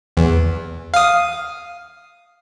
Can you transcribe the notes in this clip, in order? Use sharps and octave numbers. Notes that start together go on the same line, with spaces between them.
E2
F5 D#6